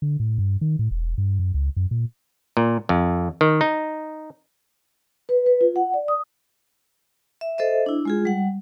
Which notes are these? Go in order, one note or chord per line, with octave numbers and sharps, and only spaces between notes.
D3
A2
G2
D#3
A2
E1
G2
F#2
C#2
F#2
A#2
A#2
F2
D#3
D#4
B4
B4
F4
F#5
D5
D#6
E5
A4 C5 D#5 E5
D4 E4
G#3 F4 G#4
G3 F#5